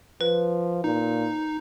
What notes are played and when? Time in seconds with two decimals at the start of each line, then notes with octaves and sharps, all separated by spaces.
0.21 F3 B4
0.84 A#2 D#4